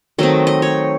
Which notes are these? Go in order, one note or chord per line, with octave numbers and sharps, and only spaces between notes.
D#3 F#3 A3 C4 D#5
D#5
C#5